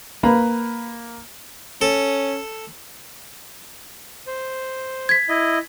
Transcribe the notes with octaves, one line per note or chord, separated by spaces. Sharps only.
A#3 B4 A#5 B5
C#4 A4
C5
G#6 B6
E4 D#5